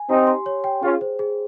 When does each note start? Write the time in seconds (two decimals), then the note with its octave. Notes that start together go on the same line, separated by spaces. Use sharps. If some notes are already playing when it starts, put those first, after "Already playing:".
Already playing: G#5
0.09 C4 D#4 G4
0.27 C6
0.46 C#5
0.64 G5
0.83 C#4 F4 G#4
1.01 C5
1.19 G#4